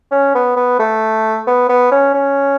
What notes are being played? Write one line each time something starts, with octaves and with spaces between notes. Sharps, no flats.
C#4
B3
B3
A3
B3
B3
C#4
C#4